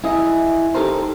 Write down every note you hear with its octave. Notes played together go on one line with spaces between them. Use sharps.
E4 G#4 D#5
D#4 G4 A4 A#4 C5